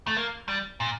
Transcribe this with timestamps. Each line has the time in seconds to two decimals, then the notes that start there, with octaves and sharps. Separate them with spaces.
0.07 A3
0.17 A#3
0.48 G3
0.80 A#2